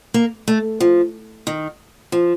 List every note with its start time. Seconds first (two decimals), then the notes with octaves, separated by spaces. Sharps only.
0.14 A#3
0.48 A3
0.80 F3
1.47 D#3
2.12 F3